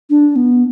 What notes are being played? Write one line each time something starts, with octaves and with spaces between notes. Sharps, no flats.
D4
B3